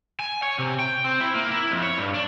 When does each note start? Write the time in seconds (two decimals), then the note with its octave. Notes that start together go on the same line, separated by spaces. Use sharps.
0.19 G#5
0.43 C#5
0.58 C3
0.79 G5
1.04 C4
1.20 E4
1.35 A#3
1.51 E4
1.71 F2
1.83 C#5
1.98 G2
2.14 D4